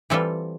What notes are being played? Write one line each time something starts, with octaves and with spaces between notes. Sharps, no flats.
E3 G3 C4 F4 A4